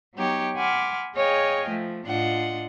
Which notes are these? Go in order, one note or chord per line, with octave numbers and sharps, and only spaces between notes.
F#3 B3 D#4 G4 C#5
F#5 G#5 B5 C6 D6 F6
G#4 C#5 D#5 F5 G5 G#5
F3 A3
A2 D4 F4 D#5 F#5 C6